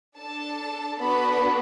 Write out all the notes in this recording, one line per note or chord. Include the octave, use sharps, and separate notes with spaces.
D4 A4 A5
B3 D4 F#4 A4 B5